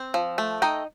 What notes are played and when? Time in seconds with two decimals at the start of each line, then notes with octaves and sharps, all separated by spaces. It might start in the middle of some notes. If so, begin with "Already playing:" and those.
Already playing: C4
0.14 F3
0.38 A3
0.62 D#4 D#5 G5